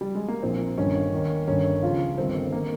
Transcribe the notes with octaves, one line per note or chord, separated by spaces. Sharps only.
G3
G#3
A#3
A#1 A#2 F3 C4
G1 G2 D#3 C#4
D#2 D#3
G1 G2 D#3 C#4
C#2 C#3 F3 F4
G1 G2 D#3 C4
D#3 A#3